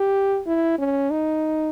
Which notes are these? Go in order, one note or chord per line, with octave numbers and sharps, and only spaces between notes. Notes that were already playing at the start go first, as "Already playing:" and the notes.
Already playing: G4
E4
C#4
D#4